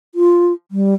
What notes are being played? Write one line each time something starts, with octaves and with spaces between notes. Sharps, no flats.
F4
G3